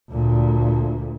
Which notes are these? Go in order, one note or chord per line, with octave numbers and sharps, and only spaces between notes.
D2 A#2